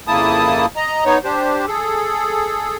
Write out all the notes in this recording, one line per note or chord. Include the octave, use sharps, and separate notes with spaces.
F2 C#3 A#3 E4 A5 D#6
D#5 A#5
B3 D#4 C#5
D4 G4 C5
G#4 A4